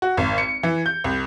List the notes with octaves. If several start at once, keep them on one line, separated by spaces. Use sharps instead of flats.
F#4
G#1
C#7
E3
G6
C2